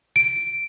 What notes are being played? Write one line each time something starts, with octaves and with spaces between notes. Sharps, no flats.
D7